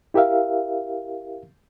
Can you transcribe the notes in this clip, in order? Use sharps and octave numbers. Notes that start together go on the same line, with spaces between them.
E4 G4 A#4 E5 F5